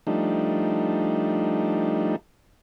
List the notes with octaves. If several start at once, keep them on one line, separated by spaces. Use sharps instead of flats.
F3 G3 A3 D4 D#4